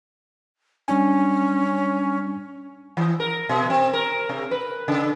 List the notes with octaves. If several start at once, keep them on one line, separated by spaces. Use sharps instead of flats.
G3 C#4 D4 G#5
E3
A#4
B2
C4
A#4
C3
B4
C#3